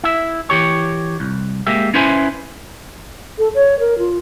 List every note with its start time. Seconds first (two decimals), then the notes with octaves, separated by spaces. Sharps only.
0.04 E4 E5
0.50 E3 G4 C#5
1.20 C2
1.67 G#3 A#3 G4 E5
1.94 C#4 E4 B4 C5 E5 G#5
3.38 A4
3.55 C#5
3.80 A#4
3.98 F4